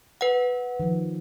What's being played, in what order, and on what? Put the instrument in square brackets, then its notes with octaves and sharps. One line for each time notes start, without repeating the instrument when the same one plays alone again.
[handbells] B4 F#5
[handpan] D#3 F3